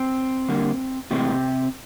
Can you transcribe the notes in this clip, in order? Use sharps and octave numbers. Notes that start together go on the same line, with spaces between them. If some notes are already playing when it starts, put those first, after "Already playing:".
Already playing: C4
D3 G3 A#3
A2 C3 E3 G#3 C4